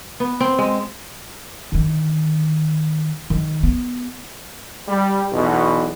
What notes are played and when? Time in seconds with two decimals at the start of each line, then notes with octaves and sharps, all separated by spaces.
0.20 B3
0.40 C4
0.59 G#3
1.72 D3 D#3
3.30 D#3
3.63 B3
4.88 G3
5.32 B1 E2 B2